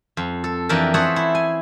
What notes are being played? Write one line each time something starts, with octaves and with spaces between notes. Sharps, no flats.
F2
A4
F2 E3 D4 G4 A#4 A5
G#4 A4 C5 C#5 E5 F#5
E4
G#5